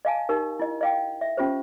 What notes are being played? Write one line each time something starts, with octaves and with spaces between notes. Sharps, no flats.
D#5 F5 G#5 A5
D#4 G4 A#4
E4 D#5
D#5 F5 G5
E5
C#4 F4 G4 C5